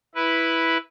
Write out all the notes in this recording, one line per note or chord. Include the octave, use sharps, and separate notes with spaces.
E4 B4